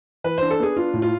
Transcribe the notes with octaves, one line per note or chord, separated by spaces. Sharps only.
E3 B4
D4 C5
A4
B3 G#4
D4 F4
A2
F4